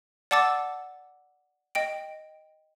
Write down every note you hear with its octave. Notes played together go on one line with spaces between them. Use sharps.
D5 F#5 A5 D6 E6 A6
D#5 G5 D7